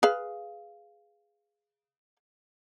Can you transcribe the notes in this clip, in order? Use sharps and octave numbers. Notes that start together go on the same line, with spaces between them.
G#4 B4 F5